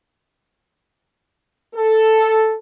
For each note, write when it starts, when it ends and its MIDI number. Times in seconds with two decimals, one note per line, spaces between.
1.75 2.54 69